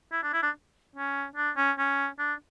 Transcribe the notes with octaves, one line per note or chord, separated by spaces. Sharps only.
E4
D4
E4
D4
C#4
D4
C#4
C#4
D4